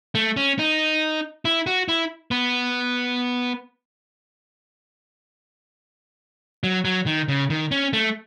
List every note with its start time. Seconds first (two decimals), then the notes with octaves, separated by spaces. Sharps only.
0.15 A3
0.37 C#4
0.59 D#4
1.45 E4
1.66 F#4
1.88 E4
2.31 B3
6.64 F#3
6.85 F#3
7.06 D#3
7.28 C#3
7.50 D#3
7.71 C#4
7.93 A3